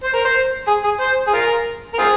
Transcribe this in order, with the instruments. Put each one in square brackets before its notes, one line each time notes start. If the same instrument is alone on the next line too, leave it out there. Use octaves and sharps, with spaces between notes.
[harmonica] C5
A#4
C5
G#4
G#4
C5
G#4
F4 A#4
A#4
C4 F4 G#4